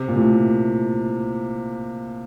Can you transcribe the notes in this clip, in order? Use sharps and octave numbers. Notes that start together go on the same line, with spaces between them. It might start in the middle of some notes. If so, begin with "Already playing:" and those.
Already playing: C3
A#2
A2